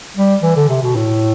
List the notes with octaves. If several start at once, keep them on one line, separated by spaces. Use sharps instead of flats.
G3
E3
D3
C3
B2
A2